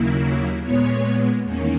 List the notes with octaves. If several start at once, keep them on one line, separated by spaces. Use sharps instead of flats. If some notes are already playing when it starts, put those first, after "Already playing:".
Already playing: D#2 C#3 F#3 A#3 E4
A#2 G#3 B3 C#5
E2 D#3 A#3 C#4